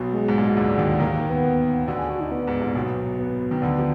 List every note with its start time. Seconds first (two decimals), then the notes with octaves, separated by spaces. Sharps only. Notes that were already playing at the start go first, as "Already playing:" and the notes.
Already playing: B1 B2
0.13 G#3
0.28 G#2
0.38 A#2
0.48 B2
0.57 D2 D3
0.68 D3
0.78 D#2 D#3
1.00 D#2 D#3 A#3
1.14 A#3
1.30 B3
1.87 D2 D3 F#4
1.98 G#4
2.10 F#4
2.20 D#4
2.31 B3
2.47 G#2
2.62 A#2
2.75 B1 B2
3.18 B3
3.51 D#3
3.62 D2 D3
3.79 F3